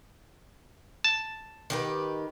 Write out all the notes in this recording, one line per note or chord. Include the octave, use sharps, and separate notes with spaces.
A5
D#3 G4 B4